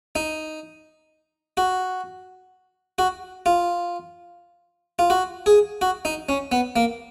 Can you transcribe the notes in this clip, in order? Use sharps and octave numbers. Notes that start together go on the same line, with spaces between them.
D#4
F#4
F#4
F4
F4
F#4
G#4
F#4
D#4
C#4
B3
A#3